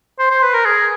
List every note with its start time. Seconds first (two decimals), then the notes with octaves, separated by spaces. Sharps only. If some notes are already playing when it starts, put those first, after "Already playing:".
0.19 C5
0.31 C5
0.43 B4
0.54 A#4
0.65 G#4